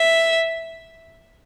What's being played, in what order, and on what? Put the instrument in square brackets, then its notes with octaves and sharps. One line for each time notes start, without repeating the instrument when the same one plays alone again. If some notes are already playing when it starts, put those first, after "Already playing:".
Already playing: [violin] E5